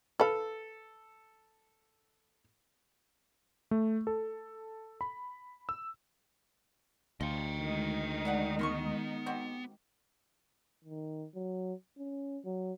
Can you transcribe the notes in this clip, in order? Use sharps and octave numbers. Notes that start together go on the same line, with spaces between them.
A4 B4 F5
A3
A4
B5
E6
D2 F3 D#5 G5
D#3 G#3 D#4
D4 G4 F#5
B3 A#4 C6 C#6
C4 F#4 G4
D#3
F#3
C#4
F#3